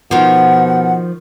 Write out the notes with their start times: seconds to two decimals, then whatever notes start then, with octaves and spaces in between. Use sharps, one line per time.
0.11 B2 D#3 F3 F#5